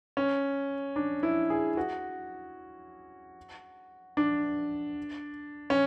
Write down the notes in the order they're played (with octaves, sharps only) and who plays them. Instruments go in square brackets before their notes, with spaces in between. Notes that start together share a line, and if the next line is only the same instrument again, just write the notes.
[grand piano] C#4
D4
E4
G#4
F#4
D4
C#4